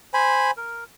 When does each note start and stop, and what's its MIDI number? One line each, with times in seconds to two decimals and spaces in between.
0.14 0.51 72
0.14 0.51 80
0.14 0.51 83
0.57 0.84 70